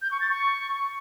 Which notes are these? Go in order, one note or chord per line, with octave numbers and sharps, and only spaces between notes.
G6
C#6
A6
C#6